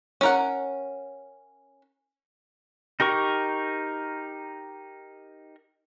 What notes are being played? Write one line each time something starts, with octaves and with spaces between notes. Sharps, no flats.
C#4 A#4 F#5
D#4 G4 A#4 C#6